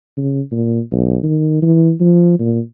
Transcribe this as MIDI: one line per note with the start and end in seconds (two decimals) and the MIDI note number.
0.17 0.41 49
0.51 0.79 46
0.92 1.17 35
1.24 1.58 51
1.62 1.92 52
2.00 2.39 53
2.39 2.60 46